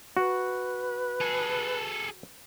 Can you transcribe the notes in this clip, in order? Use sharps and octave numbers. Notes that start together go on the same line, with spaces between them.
F#4 B4
G#4 A4